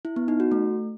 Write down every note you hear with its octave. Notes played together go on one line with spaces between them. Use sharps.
E4
B3
D#4
F#4
A3